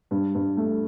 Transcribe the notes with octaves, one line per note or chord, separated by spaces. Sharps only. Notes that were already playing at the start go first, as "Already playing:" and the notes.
G2
G2
A3